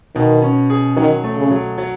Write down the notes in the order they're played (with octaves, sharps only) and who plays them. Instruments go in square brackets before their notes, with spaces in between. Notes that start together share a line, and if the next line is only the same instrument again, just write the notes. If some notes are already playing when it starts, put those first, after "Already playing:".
[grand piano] B2 [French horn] D#3
[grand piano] C#4
G#4
[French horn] D#3 [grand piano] F#3
[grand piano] A3
[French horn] C#3
[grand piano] F#3
F#3